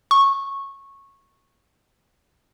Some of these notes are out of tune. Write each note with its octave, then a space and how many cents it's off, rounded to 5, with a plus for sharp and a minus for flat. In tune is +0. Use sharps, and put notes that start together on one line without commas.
C#6 -15